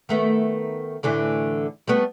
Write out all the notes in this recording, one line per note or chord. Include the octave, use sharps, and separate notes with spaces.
D#3 A3 B3
A2 D3 E3
G3 A3 B3